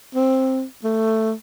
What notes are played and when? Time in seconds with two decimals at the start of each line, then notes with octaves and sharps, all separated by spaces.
0.15 C4
0.84 A3